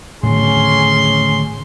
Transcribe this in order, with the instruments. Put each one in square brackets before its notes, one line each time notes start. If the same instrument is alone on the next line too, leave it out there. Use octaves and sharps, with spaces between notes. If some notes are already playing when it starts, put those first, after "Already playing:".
[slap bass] A2 D3 D#3 [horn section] C#4 G#4 C6